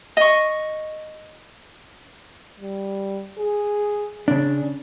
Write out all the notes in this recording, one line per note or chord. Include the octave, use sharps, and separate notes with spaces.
D#5 C#6
G3
G#4
C#3 C#4 D4